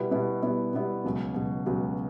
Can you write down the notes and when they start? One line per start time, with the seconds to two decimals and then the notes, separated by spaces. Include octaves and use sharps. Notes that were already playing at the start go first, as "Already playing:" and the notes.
Already playing: B2 G3 B3 E4
0.11 B2 G3 B3 E4
0.42 B2 G3 B3 E4
0.73 B2 G3 B3 E4
1.04 C#2 B2 F#3
1.34 C#2 B2 F#3
1.66 C#2 B2 F#3